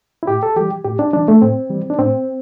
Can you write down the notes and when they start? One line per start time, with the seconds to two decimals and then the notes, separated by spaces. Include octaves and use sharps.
0.23 E4
0.27 A2 G4
0.43 A4
0.56 E3 G3 G4
0.85 A2 G4
0.99 D4
1.13 E3 G3 D4
1.28 A3
1.41 A2 C4
1.70 E3 G3
1.90 D4
1.99 A2 C4